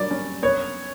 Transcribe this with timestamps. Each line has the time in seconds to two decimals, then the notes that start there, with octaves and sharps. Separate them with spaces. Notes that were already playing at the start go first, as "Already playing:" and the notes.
Already playing: F#3 G3 D5
0.11 C#4
0.43 B3 C#5